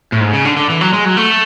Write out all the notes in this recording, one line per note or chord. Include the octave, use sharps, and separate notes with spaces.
A2
G#2
C#3
D3
D3
E3
F#3
G#3
F#3
A3